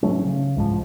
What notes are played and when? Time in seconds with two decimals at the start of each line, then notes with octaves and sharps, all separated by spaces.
0.03 G#1 F#3 A3 C#4
0.25 C#3
0.56 C2 G#2 F3